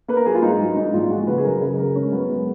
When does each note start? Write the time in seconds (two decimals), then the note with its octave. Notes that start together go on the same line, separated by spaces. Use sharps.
0.08 A#3 B4
0.17 A#4
0.26 F#3 G#4
0.35 F4
0.42 G#2 D#4
0.60 F#3
0.77 G#2 D#4
0.94 A#1 F4
1.11 G#3 F#4
1.27 C#3 B4
1.38 G#4
1.44 F#2 A#4
1.62 C#3
1.78 C#3 A#4
1.96 G#3 C#4
2.12 F#2 B3
2.29 G#3